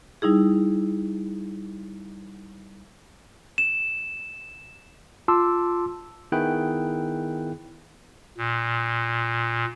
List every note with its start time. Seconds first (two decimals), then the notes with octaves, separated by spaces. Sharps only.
0.22 G3 D#4 E4 G#4
3.58 E7
5.28 F4 A5 C6 D6 E6
6.32 D#3 B3 E4 G#4 G5 F#6
8.38 A#2